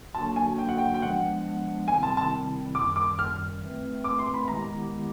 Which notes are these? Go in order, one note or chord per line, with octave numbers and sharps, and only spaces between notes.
D3 F#3 A#3 D4 F#4 A5
G#5
G5
F#5
G5
G5
F3 G#3 B3 D4 F#5
C3 D#3 G3 C4 E4 G#5
A5
A5
F#2 D#3 G3 D6
D6
F6
A2 E3 A3 C4
D6
C6
B5
D#3 G#3 B3 E4 G4 A#5